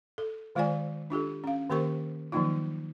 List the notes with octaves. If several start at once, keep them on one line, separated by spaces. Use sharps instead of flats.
A4
D#3 G#3 F4 C5 D5 G#5
D4 F4 G4 A4
C#4 F5
D#3 A#3 G4 A#4 C5 C#6
D#3 F3 F#3 A#3 D#4 F4